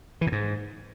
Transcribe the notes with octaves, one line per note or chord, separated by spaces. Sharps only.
E3
A2
G#2